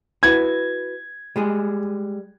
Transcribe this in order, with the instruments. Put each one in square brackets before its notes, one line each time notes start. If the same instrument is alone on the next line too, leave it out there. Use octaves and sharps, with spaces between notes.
[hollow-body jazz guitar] E4 F#4 B4 [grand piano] G#6
[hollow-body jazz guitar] G3 G#3 G#4